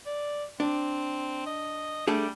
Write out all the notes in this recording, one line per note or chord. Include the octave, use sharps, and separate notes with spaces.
D5
C4 D4
D#5
G3 A3 D4 G#4